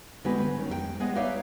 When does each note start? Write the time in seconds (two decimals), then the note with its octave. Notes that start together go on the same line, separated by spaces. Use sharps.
0.24 D3 G#3 B3 C4 F#4 B4
0.40 B3
0.57 D#3 C#4
0.68 F2 G#3 G#4 G5
1.00 G#3 B3 G#4 D5 D#5
1.15 D#4 B4 C#5 D5 E5 F5